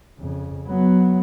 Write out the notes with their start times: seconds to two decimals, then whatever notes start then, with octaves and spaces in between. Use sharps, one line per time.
0.19 F2 C#3
0.67 F#3 B3